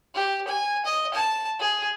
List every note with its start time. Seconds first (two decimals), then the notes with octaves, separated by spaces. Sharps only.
0.14 G4
0.47 G#5
0.85 D#5
1.13 A5
1.60 G#4